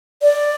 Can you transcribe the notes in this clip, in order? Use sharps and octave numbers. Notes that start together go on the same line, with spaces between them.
D5